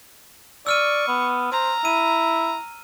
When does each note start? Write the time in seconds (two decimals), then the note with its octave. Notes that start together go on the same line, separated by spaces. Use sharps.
0.67 D5 C#6 E6 F6 D#7
1.08 B3
1.52 C5 A#5
1.85 E4 D#7